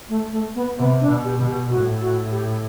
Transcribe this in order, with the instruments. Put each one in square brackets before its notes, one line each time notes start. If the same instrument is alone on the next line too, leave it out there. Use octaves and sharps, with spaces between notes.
[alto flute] A3
A3
B3
[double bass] C3 [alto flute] B3
[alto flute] D4
[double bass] B2
[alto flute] G4
[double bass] B2
[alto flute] G4
[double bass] A2 [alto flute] F#4
[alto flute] F#4
G4